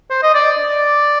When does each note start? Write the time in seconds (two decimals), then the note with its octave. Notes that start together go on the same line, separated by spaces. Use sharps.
0.10 C5
0.23 D#5
0.34 D5
0.58 D5